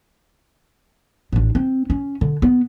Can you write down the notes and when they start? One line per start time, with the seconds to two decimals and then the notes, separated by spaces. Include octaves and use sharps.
1.32 A1 D4
1.55 C4
1.90 C#4
2.21 D3
2.42 B3